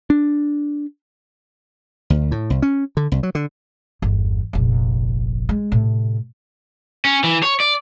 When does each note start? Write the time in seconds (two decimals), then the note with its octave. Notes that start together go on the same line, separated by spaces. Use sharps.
0.10 D4
2.10 D2
2.31 A2
2.50 C2
2.62 C#4
2.97 D3
3.12 C2
3.23 F#3
3.35 D3
4.02 G1 E2
4.53 F1 A#1
5.49 G#3
5.72 A2 C3
7.05 C#4
7.24 E3
7.43 C#5
7.60 D5